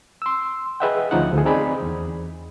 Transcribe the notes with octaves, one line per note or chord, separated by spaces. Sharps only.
C6 E6
G#4 B4 D#5 E5 F#5 G5
D2 F3 C#4 D#4 F#5
D2 G#4
C4 D#4 G#4 D5 B5
E2